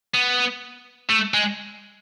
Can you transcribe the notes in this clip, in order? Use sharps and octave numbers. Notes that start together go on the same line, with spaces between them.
B3
A3
G#3